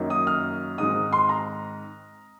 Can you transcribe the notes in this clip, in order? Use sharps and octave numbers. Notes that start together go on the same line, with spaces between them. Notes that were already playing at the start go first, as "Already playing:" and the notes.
Already playing: F#2 D#3 F#3 A#3 D#4
D#6
F6
G#2 D#3 G#3 C4 D#4 D#6
C6
A#5